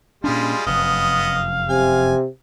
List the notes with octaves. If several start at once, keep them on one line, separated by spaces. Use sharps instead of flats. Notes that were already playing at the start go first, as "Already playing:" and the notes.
A#2 G3 G#3 C#4 D4 F4
F1 F#2 B3 D#5 F5
C3 G#5